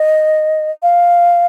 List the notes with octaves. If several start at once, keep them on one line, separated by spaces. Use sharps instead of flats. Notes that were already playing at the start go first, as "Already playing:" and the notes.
Already playing: D#5
F5